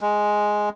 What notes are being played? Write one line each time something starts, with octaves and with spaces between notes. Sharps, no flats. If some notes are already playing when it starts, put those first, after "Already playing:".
G#3